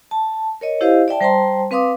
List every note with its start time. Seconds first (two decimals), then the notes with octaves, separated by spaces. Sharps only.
0.11 A5
0.61 A#4 C#5 D#5
0.81 E4 G4 C5 D#5 F5
1.08 D5 E5 G5 A5
1.21 G3 C5 G5 A5 A#5 C6
1.71 C4 B4 F5 C6 D6 D#6